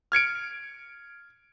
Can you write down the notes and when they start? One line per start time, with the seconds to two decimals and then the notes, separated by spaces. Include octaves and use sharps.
0.12 F6 G#6 C#7 D7